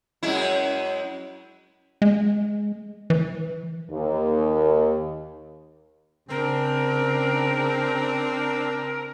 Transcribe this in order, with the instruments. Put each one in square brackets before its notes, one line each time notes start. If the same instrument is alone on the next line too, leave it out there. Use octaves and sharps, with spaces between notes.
[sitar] F#2 G#3 E4
[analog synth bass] G#3
E3
[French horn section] D#2
[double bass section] C#3 [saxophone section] C4 [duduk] D4 [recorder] A#4